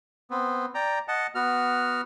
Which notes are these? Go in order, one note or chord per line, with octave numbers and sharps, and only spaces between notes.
B3 C4
D5 G5 A#5
D#5 F#5 A5
B3 F#4 F6